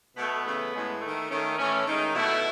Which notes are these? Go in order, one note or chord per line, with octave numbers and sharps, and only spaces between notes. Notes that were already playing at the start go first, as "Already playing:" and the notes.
B2 A3 B3
C#3 E3 A3
A2 G#3
D#3 A3
D#3 A3 C#4
A2 E3 A3 C#4
D#3 G#3 D#4
B2 A3 E4